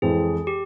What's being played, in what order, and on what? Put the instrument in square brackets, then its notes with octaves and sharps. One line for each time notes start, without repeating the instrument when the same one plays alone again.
[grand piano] F2 E3 G#3 C4 [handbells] G#4
[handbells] G4